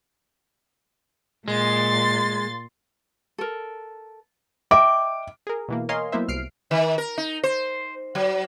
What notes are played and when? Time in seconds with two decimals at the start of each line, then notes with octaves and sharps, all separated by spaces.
1.48 A#2 G#3 C6 A6
3.38 A4 A#4
4.71 D#5 E5 G5 D6
5.47 G#4 A#4
5.68 B2 E3 A#3
5.89 A#4 C#5 D#5 F5 G#5 C6
6.12 F#3 A#3 B3 E4 C5 E5
6.28 C2 F6 C7 D7
6.71 D#3
6.98 A#4
7.18 D#4
7.44 C5
8.15 F#3